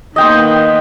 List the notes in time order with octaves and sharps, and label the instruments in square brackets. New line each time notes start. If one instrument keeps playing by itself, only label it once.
[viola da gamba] D#3 A#3 B3 [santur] D#5 G5 C6